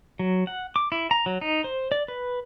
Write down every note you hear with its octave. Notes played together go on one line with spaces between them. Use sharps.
F#3
F#5
D6
E4
A#5
F#3
D#4
C5
D5
B4